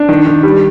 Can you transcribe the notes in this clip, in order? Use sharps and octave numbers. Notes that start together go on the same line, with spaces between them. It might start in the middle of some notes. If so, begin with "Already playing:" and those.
Already playing: D4
D#3
D#3
G3